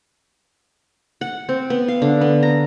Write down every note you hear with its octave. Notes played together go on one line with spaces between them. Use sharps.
F#5
C4
B3
F5
D3
B3
A#5